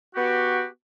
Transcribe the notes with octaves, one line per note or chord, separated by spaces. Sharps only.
B3 F#4 G4